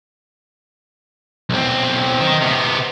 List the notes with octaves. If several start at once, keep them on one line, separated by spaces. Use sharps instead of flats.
B1 C4
D#3
C3 B3